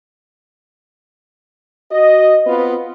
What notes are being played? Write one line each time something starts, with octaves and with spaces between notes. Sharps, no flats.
F#4 D#5
B3 C4 F4 B4